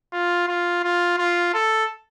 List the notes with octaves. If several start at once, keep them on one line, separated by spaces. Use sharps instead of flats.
F4
F4
F4
F4
A4